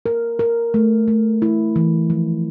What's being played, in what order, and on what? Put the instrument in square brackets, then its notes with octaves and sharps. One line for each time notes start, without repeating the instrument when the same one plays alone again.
[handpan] A#4
A#4
A3
A3
E4
E3
F3